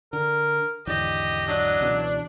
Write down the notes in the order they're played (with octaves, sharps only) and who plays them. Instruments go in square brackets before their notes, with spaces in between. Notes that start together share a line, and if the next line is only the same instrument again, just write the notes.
[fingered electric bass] D3 [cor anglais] A#4
[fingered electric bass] G#1 E2 D3 [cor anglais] G4 [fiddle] D#5
[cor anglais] F#3 [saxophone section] D4
[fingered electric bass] C#2 B2 E3